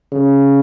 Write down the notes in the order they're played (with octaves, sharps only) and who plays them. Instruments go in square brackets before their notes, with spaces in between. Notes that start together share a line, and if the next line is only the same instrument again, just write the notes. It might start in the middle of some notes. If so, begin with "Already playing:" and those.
[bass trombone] C#3